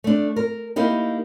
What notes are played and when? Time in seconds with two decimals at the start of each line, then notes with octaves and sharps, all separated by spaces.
0.04 A3 D4
0.36 A#4
0.76 A#3 D#4 E4 G4